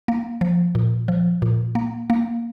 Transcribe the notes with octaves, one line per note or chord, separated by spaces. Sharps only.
A#3
F3
A#2
F3
A#2
A#3
A#3